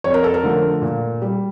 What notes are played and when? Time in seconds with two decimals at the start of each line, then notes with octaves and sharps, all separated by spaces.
0.04 F2 C#5
0.14 A#4
0.24 A4
0.34 A#4
0.43 D3 F3 A3
0.82 A#2
1.22 G3